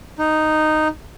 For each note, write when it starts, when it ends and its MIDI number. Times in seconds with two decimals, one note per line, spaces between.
0.18 0.88 63